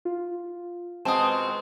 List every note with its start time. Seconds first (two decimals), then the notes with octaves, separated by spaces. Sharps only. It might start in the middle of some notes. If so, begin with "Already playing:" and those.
0.05 F4
1.05 B2 G#3 C4 A5 D#6